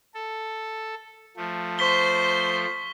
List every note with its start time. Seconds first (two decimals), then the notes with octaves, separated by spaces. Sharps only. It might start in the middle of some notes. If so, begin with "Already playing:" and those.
0.15 A4
1.37 F3 A3
1.79 C5 C6 C#6 B6 G7